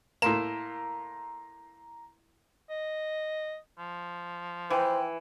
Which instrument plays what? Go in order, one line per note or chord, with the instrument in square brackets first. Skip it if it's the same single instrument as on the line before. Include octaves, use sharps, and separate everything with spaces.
[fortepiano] A2 A#3 [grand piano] A#5 C6 [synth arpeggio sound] E7
[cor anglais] D#5
F3
[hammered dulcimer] E3 [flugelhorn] C5 [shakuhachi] G5